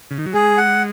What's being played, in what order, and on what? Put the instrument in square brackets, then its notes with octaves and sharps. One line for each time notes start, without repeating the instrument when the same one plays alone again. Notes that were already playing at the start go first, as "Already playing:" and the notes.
[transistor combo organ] C#3
D#3
F#3
[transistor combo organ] G#3 [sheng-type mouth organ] G#4
[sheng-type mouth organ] F#5